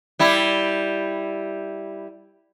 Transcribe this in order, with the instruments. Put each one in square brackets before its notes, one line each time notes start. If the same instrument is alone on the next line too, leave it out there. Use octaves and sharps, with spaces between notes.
[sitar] G3 E4